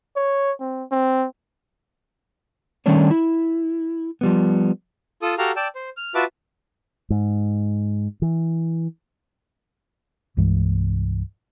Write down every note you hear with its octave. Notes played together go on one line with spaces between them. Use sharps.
C#5
C4
C4
D#3 G3 A3 C#4 D4 C#5
E4
F3 G3 B3
F4 A4 D#6
F#4 G4 A4 F5 A#5
D5 G5 A5 E6
C5
F6
F4 F#4 B4 E5 A5 D6
G#2
E3
C2 G2 E3 G#3